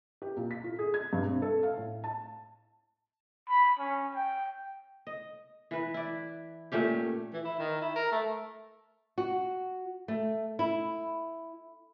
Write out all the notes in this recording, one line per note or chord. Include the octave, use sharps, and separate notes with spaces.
G4
A#2
B6
F4
G#4
G#6
G2
C3
A4
F5
A2
A5
B5
C#4
G5
D#5
E3 B4
E4 D5
A#2 A3 C#4 G4
E3
E4
D#3
E4
A#4
A3
F#4
A3
E4